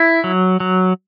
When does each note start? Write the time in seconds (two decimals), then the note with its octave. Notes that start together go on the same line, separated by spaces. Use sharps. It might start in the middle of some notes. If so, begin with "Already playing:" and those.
Already playing: E4
0.24 F#3
0.60 F#3